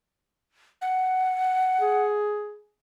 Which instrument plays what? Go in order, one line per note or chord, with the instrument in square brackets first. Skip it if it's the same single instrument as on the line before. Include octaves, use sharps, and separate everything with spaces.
[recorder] F#5
[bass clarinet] G#4